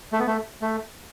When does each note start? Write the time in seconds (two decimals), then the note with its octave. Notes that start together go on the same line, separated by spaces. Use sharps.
0.12 A3
0.19 B3
0.27 A3
0.62 A3